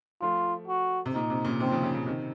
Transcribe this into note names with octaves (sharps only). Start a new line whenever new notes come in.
F3 A3 F4
F#4
C3
A#2 D#4
C3
A#2 C#3
C3 D#3 C4
C#3 F3
C#3 F3
A#2 C#3
C3 D#3